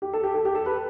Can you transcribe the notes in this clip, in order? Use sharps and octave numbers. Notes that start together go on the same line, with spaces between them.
G4
A4
G4
A4
G4
A4
B4